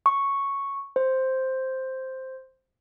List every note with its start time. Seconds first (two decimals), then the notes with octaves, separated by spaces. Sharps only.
0.06 C#6
0.96 C5